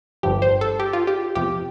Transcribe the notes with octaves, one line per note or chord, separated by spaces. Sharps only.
G1 G2 D3 F3 G4
C5
A4
G4
F4
G4
E2 C3 F3 G4